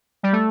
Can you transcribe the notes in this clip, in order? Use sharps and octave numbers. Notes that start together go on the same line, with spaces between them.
G3
A3